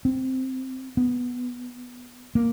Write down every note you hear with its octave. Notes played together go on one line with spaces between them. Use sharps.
C4
B3
A#3